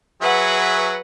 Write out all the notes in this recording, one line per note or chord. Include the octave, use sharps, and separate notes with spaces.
F#3 G#4 B4 E5 F#5